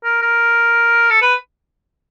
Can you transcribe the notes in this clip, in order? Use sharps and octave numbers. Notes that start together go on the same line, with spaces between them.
A#4
A#4
A4
B4